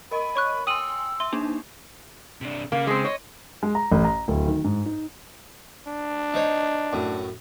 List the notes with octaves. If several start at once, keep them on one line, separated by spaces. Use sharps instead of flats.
A#4 D#5 B5 D#7
C#5 C#6 F#6
G5 G#5 C6 D#6 E6 D#7 F#7
E5 C6
A#3 D4 D#4
C3 D4
C#3 A#3
G#3 C4
C#5 D#5
G#3
A#5
A1
A#5
D1
D#3
G#2
D#4
D4
D#4 C5 C#5
F#2 A2